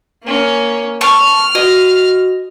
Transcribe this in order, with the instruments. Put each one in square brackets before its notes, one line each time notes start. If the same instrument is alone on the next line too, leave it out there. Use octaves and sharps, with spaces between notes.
[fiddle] A#3 C#4
[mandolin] A5 C#6 [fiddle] F6
[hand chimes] F#4 [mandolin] D#5